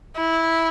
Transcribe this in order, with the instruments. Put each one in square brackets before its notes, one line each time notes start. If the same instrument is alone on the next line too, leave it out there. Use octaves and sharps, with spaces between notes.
[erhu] E4